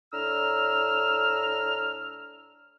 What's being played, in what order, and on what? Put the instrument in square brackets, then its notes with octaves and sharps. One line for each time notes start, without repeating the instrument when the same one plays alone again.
[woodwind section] A2 D4 A#5 E6 F6